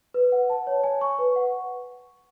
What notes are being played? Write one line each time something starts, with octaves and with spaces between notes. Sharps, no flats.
B4
F#5
A5
C#5
G#5
C#6
B4
F#5